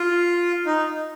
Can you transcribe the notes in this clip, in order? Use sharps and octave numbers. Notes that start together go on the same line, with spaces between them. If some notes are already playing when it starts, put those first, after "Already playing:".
Already playing: F4
D#4